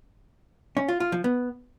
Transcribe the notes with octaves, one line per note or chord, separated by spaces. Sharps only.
C#4
F4
F4
F3
B3